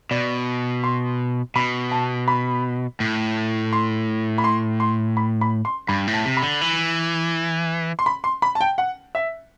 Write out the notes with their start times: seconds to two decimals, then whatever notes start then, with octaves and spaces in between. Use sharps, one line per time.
0.11 B2 D5
0.84 C6
1.56 B2 B5
1.91 A5
2.28 B5
3.00 A2
3.73 C6
4.38 B5
4.44 C6
4.80 C6
5.17 B5
5.41 B5
5.65 C6
5.88 G2 B5
6.08 A2
6.14 A5
6.25 C3
6.37 B5
6.43 D3
6.61 E3
7.99 C6
8.06 B5
8.24 C6
8.42 B5
8.55 A5
8.61 G5
8.78 F#5
9.15 E5